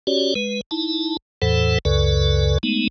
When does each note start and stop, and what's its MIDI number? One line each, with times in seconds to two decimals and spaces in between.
0.07 0.34 61
0.07 0.34 66
0.07 0.34 67
0.07 0.34 73
0.07 0.34 74
0.35 0.61 56
0.35 0.61 71
0.71 1.17 63
0.71 1.17 64
0.71 1.17 81
1.42 1.78 40
1.42 1.78 45
1.42 1.78 52
1.42 1.78 69
1.42 1.78 72
1.42 1.78 78
1.85 2.58 37
1.85 2.58 42
1.85 2.58 49
1.85 2.58 69
1.85 2.58 71
1.85 2.58 74
2.63 2.88 56
2.63 2.88 57
2.63 2.88 59
2.63 2.88 63